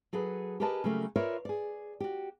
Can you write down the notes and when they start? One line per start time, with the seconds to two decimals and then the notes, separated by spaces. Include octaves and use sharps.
0.13 F#3 G#4 A4 B4
0.60 G4 G#4 A#4 B4 D#5 A5
0.84 C#3 F#3 G3 A3 A#3
1.16 F4 A#4 B4 C#5 D5 E5
1.45 G#4 D5
2.00 F#4 G4